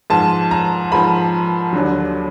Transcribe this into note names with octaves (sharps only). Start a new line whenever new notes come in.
G#2 F3 A5
A#5
G#2 F3 B5
D#2 D3 F#3